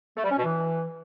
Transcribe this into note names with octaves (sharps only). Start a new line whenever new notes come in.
A3
G3
C#4
B2
E3